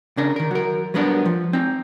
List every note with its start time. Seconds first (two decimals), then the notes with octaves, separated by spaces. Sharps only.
0.17 C#3 D4 A#4
0.36 D#3 A#4
0.51 F#3 A#4
0.94 F#3 G3 B3 D4 A#4
1.25 F3
1.53 C4 D#4